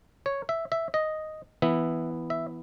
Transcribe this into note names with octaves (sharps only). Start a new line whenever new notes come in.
C#5
E5
E5
D#5
E3 B3 E4 E5
E5